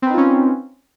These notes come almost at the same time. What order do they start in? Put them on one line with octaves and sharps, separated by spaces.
C4 B4 D#4 F4 C#4